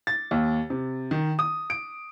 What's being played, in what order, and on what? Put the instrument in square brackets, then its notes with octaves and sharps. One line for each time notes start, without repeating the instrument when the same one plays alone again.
[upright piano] A6
D#2
C3
D#3
D#6
D7